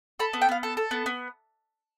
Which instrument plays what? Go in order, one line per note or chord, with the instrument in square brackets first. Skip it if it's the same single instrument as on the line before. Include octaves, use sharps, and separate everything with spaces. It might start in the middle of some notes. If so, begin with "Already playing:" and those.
[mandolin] A4 B5
B3
G5
B3 F5
A4
A4
B3
B3